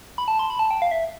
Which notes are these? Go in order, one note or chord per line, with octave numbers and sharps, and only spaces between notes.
B5
A5
C6
B5
A5
G5
F5
E5